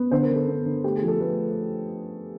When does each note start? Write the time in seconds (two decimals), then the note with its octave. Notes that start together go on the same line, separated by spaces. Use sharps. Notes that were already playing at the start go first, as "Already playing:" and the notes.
Already playing: B3
0.11 D3 C5
0.23 A#4
0.30 D3
0.36 A4
0.48 B3
0.65 D3
0.84 A3 G4
0.96 G#4
1.02 F3
1.08 A4
1.20 A3 B4